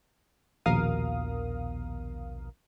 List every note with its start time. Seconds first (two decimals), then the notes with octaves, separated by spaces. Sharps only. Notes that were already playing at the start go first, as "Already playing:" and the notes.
0.66 A#1 D#2 B2 A#4 F5 D#6